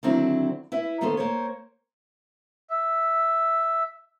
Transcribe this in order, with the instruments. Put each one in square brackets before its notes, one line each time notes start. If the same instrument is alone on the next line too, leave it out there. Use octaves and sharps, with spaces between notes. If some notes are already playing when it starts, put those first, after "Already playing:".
[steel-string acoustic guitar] D3 D#3 F#3 C4 D4 E4
E4 B4 E5
D#3 A#3 B3 D4 A4 C5
A#3 C5 C#5
[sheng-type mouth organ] E5